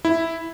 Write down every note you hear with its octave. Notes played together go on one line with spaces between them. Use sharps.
E4